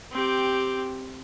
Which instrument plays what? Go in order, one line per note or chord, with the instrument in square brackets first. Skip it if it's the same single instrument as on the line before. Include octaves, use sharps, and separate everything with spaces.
[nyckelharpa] C4 G4